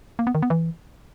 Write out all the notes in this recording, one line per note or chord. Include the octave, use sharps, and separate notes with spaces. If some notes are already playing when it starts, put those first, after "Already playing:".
A#3
B3
D#3
B3
E3